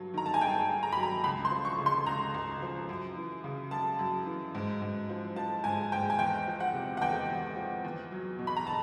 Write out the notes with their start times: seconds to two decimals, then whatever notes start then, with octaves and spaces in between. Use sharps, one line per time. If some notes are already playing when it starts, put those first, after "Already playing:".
Already playing: G2 F#3
0.14 D#3 A#5
0.26 A5
0.34 G#5
0.41 G2 G5
0.69 G2
0.83 A#5
0.92 F#3 B5
1.03 A#5
1.24 C#2 B5
1.45 C6
1.51 F3
1.65 C#6
1.78 C#3
1.86 C6
2.06 C#2 A#5
2.34 C#2
2.62 F3
2.89 F#2
3.17 E3
3.44 C#3
3.71 F#2 A5
3.99 F#2
4.26 E3
4.55 G#2
4.82 G#2
5.09 F3
5.36 F3 A5
5.64 G#2 G#5
5.92 G#2 G5
6.10 G#5
6.18 E2 G5
6.47 F3
6.60 F#5
6.74 C3
6.97 F#5
7.02 E2 G5
7.30 E2
7.56 F3
7.84 E2
8.11 F#3
8.39 B2
8.47 B5
8.57 A#5
8.67 A5